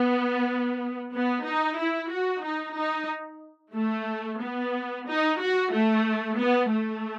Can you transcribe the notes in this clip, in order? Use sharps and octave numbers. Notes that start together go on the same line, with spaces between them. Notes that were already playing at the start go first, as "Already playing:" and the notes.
Already playing: B3
B3
D#4
E4
F#4
D#4
D#4
A3
B3
D#4
F#4
A3
B3
A3